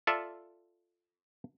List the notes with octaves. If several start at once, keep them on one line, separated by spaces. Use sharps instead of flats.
F4 A4 D5 E5